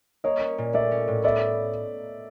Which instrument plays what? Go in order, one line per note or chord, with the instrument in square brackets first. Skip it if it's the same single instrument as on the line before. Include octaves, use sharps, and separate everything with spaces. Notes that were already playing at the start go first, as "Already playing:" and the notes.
[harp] A#3 [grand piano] C#5 D#5
[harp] C#4
A#2
[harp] A3 [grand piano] D5 E5
[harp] C#4
A2
[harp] B3 [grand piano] D5 E5